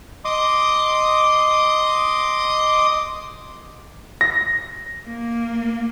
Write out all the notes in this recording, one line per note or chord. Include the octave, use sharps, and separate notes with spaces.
D#5 C6 D6 D#6
A#6
A#3